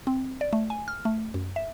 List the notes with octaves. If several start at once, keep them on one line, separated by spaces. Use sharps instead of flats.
C4
D5
A3
G#5
F6
A3
F#2
E5